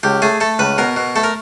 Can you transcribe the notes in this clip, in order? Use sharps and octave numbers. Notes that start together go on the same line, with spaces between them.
C#2 G4
A3 G#4
A3 A4
C#2 B4
B2 A#4
B2
A3 A4
A#4